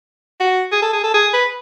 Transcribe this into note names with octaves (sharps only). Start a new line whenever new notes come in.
F#4
G#4
A4
G#4
A4
G#4
B4